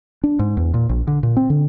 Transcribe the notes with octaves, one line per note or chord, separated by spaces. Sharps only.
D4
G#2
E2
A#2
A#1
D3
A#2
C4
D3